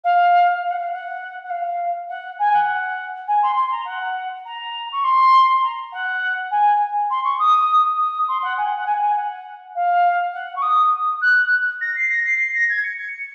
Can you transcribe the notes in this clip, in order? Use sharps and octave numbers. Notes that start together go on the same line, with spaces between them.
F5
F5
F#5
F5
F#5
F#5
F5
F#5
G#5
F#5
G#5
C6
C6
A#5
F#5
A#5
C#6
C6
A#5
F#5
G#5
C6
C#6
D#6
D#6
C6
F#5
G#5
F#5
F#5
G#5
F#5
G#5
F#5
F5
F#5
C#6
D#6
F#6
A#6
C7
A#6
C7
C7
A#6
G#6
C#7
C#7